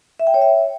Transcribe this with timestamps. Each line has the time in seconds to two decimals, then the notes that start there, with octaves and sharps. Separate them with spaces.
0.20 E5
0.27 G5
0.34 C#5
0.42 E5